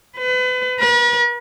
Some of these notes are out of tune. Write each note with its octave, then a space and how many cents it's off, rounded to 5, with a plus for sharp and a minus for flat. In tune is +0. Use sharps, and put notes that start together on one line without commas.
B4 +35
B4 -45